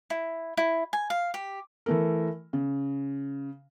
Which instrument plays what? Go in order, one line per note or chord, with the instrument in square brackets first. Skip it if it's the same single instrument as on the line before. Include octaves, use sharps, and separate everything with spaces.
[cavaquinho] E4
E4
G#5
F5
G4
[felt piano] E3 A3 A#4
C#3